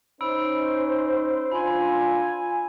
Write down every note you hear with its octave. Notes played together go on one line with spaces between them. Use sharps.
C#4 D#4 C5 B5 E6 D7
D4 F4 G#5 B5 C6